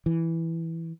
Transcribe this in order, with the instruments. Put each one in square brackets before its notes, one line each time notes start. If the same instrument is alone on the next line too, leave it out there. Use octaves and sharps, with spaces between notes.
[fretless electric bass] E3